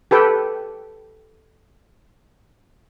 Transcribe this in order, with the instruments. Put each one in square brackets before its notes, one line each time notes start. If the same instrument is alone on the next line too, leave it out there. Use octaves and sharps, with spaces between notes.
[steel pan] G4 A4 B4 G5